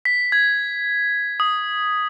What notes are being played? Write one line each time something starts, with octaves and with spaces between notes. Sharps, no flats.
B6
G#6
D#6